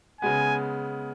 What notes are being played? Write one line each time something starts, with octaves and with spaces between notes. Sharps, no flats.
C#3 G#3 B3 G#5